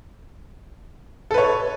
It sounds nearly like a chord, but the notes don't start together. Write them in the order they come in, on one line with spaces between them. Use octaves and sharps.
A4 B4 C#5